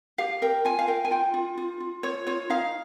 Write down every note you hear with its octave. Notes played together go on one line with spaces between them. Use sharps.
G4 F5
A#4 G5
F4 G#5
F5
A#4 G5
G#5
F4 G5
F4
F4
F4
F4 C#5
F4 C#5
D#4 F5